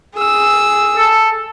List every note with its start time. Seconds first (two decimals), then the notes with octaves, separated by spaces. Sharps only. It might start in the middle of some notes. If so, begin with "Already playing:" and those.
0.15 G#4 E6
0.97 A4